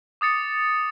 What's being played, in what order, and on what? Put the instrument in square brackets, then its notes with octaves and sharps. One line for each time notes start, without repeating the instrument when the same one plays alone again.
[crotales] D6 D#6 A6 C#7